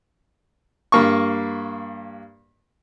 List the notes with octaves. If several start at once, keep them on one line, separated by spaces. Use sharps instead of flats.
G2 A#3 C#6